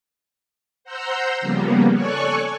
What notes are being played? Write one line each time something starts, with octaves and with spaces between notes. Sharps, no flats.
C5 F#5 A#5 C6 E6 G6
C#3 F3 G3 A#3 B3
A4 C#5 D5 G#5 C#6 F#6